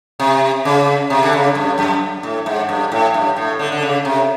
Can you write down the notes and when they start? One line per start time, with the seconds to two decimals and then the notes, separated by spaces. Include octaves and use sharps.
0.20 C3
0.65 C#3
1.10 C3
1.23 D3
1.33 C#3
1.55 G2
1.78 F#2
2.23 A2
2.46 G#2
2.69 G2
2.92 A2
3.14 G2
3.37 A2
3.59 D3
3.72 D3
3.82 C#3
4.05 C3